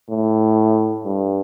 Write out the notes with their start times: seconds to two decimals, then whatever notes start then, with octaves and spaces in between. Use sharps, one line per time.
0.11 A2
1.05 G2